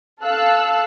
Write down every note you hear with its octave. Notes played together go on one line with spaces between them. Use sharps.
A4 F5 E6 F#6